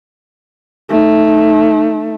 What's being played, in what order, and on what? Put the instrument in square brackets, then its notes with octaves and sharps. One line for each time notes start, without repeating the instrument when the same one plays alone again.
[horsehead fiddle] A3 D#4